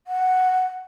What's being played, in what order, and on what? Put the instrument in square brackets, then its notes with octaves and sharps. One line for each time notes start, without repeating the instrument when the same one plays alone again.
[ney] F#5